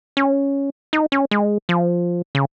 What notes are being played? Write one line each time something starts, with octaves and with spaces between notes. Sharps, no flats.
C#4
D#4
C#4
G#3
F3
C#3